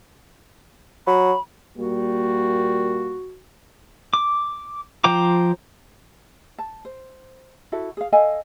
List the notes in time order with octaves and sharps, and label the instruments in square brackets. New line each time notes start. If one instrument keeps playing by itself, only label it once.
[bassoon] F#3 [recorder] B5
[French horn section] A#2 G3 A#3 [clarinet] F#4
[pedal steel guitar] D6
F3 C5 G5 A#5 D6
[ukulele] A5
C5
E4 F#4 A4 E5
G#4 F5
A4 D#5 F5 G#5